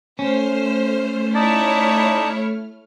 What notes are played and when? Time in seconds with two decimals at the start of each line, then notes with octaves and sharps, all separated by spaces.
0.19 A3 C#4 C5 F6
1.35 D#4 E4 C#5 D5 A5